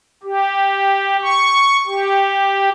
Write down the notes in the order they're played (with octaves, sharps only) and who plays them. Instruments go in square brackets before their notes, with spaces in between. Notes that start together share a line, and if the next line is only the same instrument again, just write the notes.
[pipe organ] G4
C#6
G4